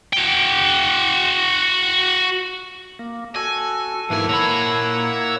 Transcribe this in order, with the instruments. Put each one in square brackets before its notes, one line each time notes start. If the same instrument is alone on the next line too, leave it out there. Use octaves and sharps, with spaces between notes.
[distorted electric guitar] F#4 G5
[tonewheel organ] A#3
[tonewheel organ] F#4 [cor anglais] A4 [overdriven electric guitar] G#5
[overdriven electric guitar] B1 G#5 [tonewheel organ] G#2 E3 [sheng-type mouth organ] A#3 E4 F#5
[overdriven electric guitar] A#2 B5 [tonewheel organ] C#5 A#5 E6